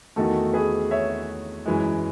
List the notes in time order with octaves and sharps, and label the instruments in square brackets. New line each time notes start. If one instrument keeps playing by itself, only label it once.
[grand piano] E2 D#3 A3 F#4 A4
G#4 B4
C#5 E5
F#2 E3 G#3